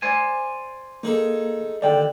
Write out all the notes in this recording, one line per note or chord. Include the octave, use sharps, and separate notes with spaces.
C5 D5 G#5
A#3 D#4 G#4 A4
D#2 D3 D5 G5